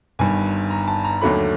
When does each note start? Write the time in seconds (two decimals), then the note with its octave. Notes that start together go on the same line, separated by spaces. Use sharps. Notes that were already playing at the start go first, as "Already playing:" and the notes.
0.19 G1 G2 D#3 G#5
0.71 A#5
0.88 A5
1.04 A#5
1.21 D#2 D3 F#3 A3 B5